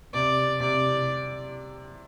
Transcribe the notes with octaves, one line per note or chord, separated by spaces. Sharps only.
C3 D5
C3 D5